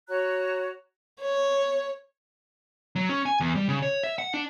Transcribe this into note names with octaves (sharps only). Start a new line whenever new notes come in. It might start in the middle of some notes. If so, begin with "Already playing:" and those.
F#4 C#5 A#5 F#6
C#5
F#3
C#4
G#5
E2
G3
C#3
C#5
E5
F#5
D4